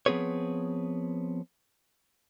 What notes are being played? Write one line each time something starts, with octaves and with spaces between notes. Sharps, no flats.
F3 B3 C4 G#4 B4 C#5